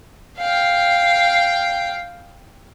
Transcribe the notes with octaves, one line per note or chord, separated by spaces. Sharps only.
F5 G5